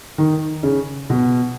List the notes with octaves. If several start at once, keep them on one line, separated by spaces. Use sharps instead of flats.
D#3
C#3
B2